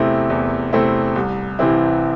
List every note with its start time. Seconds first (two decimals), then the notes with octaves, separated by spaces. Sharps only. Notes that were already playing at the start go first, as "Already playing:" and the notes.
Already playing: E2 C3 A3 C4 E4
0.30 E2
0.73 C3 A3 C4 E4
1.16 C2
1.59 C3 E3 C4 E4